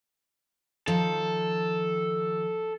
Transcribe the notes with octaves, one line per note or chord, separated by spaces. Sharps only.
D#3 F3 A4